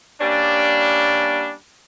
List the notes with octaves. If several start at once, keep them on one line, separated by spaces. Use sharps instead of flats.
G3 A#3 C#4 D4